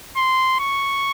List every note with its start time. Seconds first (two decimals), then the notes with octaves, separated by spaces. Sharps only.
0.17 C6
0.59 C#6